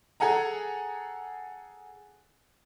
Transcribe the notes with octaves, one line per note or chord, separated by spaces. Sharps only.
G#4 A4 F#5 G#5 A#5